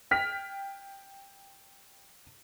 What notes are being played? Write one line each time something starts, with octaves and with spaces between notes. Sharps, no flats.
G5 F6 B6